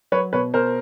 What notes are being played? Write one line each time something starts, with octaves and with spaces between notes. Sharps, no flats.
F#3 B4 C#5
B2 B4 C#5
B2 A#4 C5